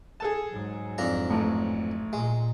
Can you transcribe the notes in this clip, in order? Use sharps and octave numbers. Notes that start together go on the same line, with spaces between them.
G#4 A4 A5
G#2 F#3
F2 D4 A#5
A1 A2
A#2 G#3